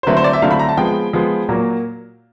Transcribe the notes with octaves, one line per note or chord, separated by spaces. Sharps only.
C5
D3 F#3 A3 C4 E4 B4
C5
D5
E5
D3 F#3 A3 C4 E4 F5
B5
A#5
A5
F3 G#3 B3 G5
F3 G#3 B3
A#2 F#3 A#3